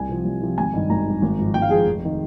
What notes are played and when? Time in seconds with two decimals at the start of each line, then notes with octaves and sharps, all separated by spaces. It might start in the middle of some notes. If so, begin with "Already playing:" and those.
Already playing: C2 G#5
0.09 C3 F3
0.25 C2
0.41 C3 F3
0.58 G#1 G#5
0.74 G2 D#3
0.90 G#1 A#5
1.06 G2 D#3
1.22 G#1
1.38 G#2 F3
1.54 G#1 G5
1.62 F5
1.70 G#2 F3 G#4
1.87 F1
2.05 D#3